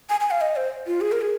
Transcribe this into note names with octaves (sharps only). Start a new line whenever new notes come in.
G#5
G#5
F5
D#5
C5
F4
G#4
A#4
G#4